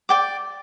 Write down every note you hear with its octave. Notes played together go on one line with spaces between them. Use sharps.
D5 G5 D6